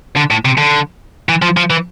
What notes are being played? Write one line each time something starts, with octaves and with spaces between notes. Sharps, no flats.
D3
A2
C3
D3
E3
F3
F3
E3